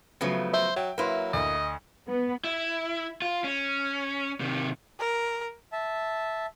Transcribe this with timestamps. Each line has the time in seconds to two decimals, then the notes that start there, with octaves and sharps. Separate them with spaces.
0.21 C#3 F3 F#3 A3 B3
0.53 C5 E5
0.77 F#3 G5
0.98 F#3 A#3 E4 B4 C6
1.33 D2 D#5
2.08 B3
2.44 E4
3.22 F4
3.44 C#4
4.40 C3 D#3
4.99 A#4
5.72 E5 A5